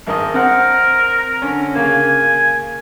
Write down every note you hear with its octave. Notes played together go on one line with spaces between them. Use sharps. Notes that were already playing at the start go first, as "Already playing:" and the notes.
G#1 A#4 D#5
C4 A#4 F#5
D3 C#4
C#3 A#3 G#5